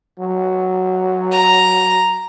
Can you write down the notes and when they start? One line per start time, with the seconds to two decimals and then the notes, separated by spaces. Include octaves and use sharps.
0.19 F#3
1.32 A#5